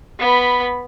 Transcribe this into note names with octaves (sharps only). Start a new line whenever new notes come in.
B3 B5